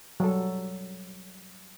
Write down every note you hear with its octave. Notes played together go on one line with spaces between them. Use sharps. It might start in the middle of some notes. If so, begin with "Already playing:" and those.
F#3 G3 A4